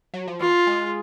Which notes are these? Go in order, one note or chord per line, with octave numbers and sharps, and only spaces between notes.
F#3
F3
E3 F4
G#3